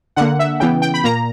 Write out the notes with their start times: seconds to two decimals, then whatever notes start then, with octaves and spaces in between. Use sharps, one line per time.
0.16 D3 A#3 F#5
0.39 E5
0.60 C#3 E3 B3 G5
0.82 G5
0.94 B5
1.04 A#2 A#3 A#5